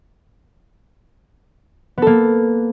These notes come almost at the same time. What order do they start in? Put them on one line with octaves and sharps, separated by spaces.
B3 A4 A#3